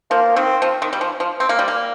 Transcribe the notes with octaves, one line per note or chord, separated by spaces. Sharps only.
F3 A#3
D#3 C4
F3
D#3
G3
F3
F3
C4
A#3
G3
A#3